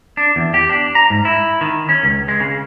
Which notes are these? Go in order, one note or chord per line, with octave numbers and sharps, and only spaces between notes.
D4
E2
G4
D4
A#5
G#2
E4
D#3
C#4
C#2
G#3
C#3